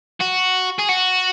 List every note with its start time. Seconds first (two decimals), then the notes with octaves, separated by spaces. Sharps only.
0.20 F#4
0.79 G#4
0.89 F#4